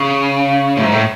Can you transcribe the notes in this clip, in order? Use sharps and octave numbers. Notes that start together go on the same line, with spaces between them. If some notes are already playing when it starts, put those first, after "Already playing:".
Already playing: C#3
A2
G#2
A2